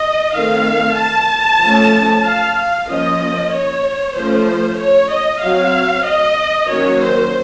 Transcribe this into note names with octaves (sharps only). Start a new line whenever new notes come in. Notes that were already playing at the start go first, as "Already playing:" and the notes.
Already playing: D#5
D#3 A3 C4 F5
A5
F3 A3 C#4
F5
F5
F3 A#3 C#4 D#5
C#5
F3 A3 C#4 C5
C#5
D#5
F#3 C4 F5
D#5
D#3 F#3 A#3 C#4 C#5
C5